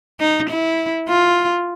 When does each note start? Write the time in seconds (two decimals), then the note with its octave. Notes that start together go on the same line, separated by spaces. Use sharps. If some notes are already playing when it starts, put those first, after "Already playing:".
0.20 D#4
0.49 E4
1.08 F4